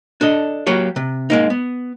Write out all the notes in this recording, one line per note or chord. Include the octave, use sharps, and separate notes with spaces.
D4 A4 D#5
F#3 A#3 G4 C#5
C3
G#3 A#3 D#4
B3